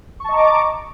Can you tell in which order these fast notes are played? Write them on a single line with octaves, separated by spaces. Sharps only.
C#6 A5 D#5 A#5 D6